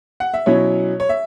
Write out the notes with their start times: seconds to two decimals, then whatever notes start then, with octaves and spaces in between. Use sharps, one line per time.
0.20 F#5
0.34 E5
0.46 B2 F#3 C#4 E4 C#5
1.00 C#5
1.09 E5